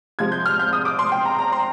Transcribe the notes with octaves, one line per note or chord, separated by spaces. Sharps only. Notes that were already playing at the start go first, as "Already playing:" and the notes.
C3 F3 G#3 G#6
G6
F6
G6
D#6
D6
C6
G5
A#5
A#5
C6